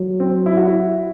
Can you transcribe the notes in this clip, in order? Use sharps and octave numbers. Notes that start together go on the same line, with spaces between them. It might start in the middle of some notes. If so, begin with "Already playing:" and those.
Already playing: F#3
C4
E4
F#4
E4